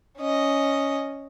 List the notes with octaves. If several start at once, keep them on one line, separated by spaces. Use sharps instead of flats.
C#4 D#5